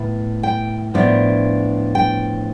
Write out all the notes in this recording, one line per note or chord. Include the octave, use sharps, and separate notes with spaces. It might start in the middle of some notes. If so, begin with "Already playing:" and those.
Already playing: A2 B3
G5
A2 F3 B3 D4
G5